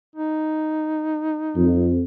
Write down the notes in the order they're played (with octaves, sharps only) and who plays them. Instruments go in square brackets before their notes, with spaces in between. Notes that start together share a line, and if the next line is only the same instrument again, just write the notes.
[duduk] D#4
[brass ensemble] F2